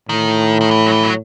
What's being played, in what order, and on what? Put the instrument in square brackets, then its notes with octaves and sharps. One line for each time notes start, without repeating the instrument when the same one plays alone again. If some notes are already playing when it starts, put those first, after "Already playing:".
[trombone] A2 [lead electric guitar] D#3
[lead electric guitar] D#3
E3
F#3
E3
F#3